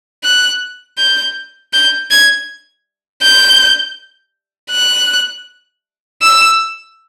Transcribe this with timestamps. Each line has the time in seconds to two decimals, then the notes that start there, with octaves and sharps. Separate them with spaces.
0.23 F#6
0.98 G6
1.73 G6
2.10 G#6
3.22 G6
4.71 F#6
6.22 E6